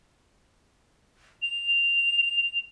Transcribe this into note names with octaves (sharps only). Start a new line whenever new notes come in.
F7